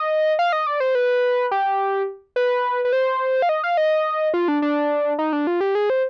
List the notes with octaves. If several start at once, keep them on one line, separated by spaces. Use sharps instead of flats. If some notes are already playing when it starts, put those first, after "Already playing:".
Already playing: D#5
F5
D#5
D5
C5
B4
G4
B4
B4
C5
F5
D#5
F5
D#5
F4
D4
D4
D#4
D4
F4
G4
G#4
C5